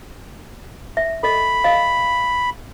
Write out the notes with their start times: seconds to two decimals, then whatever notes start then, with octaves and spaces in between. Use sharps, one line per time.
0.97 E5
1.23 A4 D#5 B5
1.64 D#5 F5